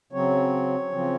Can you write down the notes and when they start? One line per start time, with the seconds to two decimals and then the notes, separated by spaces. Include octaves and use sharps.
0.12 C#3 F#3 C4 C#5
0.91 C#3 F3 C4